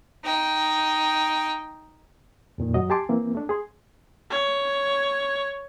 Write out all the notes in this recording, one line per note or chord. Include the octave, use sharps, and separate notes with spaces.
D#4 G5
F2 A#2 D#3
F#2 F#3 F#4 D#5
G4 G#5 A5 C6 D6
E3 A#3 C4
A3 D4
G#4 C6
C#5